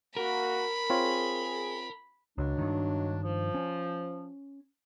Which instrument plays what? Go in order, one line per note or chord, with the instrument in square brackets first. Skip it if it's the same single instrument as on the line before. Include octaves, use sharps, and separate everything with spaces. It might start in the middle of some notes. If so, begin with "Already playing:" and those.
[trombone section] A#3 F#4 [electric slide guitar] A#4 [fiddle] B5
[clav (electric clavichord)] C4 F4 C#5 [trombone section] G#4
[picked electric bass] C#2 [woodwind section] F#3 G#3 D4
[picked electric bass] G2 D#3
[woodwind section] F3
[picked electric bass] C#4